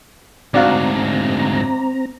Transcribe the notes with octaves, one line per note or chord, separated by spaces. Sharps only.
D2 G#2 C4 D4 F#4 F5 A#5